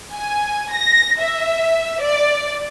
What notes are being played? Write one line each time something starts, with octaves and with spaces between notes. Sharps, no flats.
G#5
A#6
E5
D5